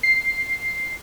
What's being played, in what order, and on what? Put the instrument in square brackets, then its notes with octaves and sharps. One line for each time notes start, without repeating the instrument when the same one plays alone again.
[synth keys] C7